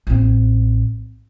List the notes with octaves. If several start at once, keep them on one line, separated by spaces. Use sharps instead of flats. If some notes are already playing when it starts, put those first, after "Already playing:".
A1 C4